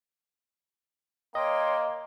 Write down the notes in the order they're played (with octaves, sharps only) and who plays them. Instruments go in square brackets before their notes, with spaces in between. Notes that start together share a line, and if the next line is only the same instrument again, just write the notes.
[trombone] A#3 [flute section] C#5 G5 C6 [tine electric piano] D#5